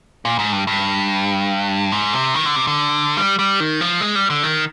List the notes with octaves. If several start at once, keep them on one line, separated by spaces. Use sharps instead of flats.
A#2
G#2
G2
G2
G#2
C3
D#3
D3
C3
D3
G3
G3
D#3
F3
G#3
G3
D3
D#3